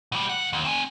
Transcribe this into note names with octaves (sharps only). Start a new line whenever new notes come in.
B2 G3
C#2 F#5
D#2
C4 G#5